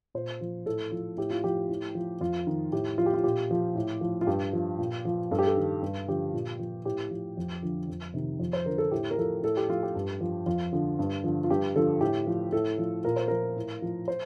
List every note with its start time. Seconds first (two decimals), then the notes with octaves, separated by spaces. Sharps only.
0.14 A#2 C5
0.41 F3
0.66 A2 A4
0.92 F3
1.17 A2 G4
1.30 F4
1.44 F3 G4
1.69 A2
1.95 F3
2.21 F2 F4
2.47 D#3
2.72 A2 G4
2.98 F3 F4
3.06 G4
3.14 F4
3.24 A#2 G4
3.51 F3
3.75 A2
4.01 F3
4.21 F4
4.27 G2 G4
4.53 F3
4.78 A#2
5.05 F3
5.31 G2 A4
5.39 G4
5.47 A4
5.57 D#3
5.82 G2
6.07 D3 F3 G4
6.33 A#2
6.59 F3
6.85 A2 G4
7.11 F3
7.37 F2
7.62 D3 F3
7.88 F2
8.14 C3 D#3
8.40 F2
8.53 C5
8.66 D3 F3 A#4
8.78 A4
8.91 A2 G4
9.11 A#4
9.18 F3 A4
9.43 A2 A4
9.57 G4
9.69 F3 F4
9.83 G4
9.95 G2
10.21 F3
10.46 F2 F4
10.73 D3 F3
10.99 G2
11.24 D3 F3
11.44 F4
11.50 G2 G4
11.75 D3 F3 A4
12.01 A2 G4
12.27 F3
12.52 A2 A4
12.78 F3
13.04 A#2 A#4
13.16 C5
13.28 F3 A#4
13.56 A2
13.82 F3
14.08 C5